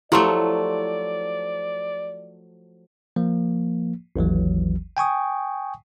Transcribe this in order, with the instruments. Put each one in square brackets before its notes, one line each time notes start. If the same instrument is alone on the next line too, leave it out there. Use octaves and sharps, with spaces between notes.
[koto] F3 F#3 A3 [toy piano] E4 G4 C6 [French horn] D5
[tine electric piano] F3 A#3
G#1 D#2 E3 F#3
G5 G#5 C#6 D#6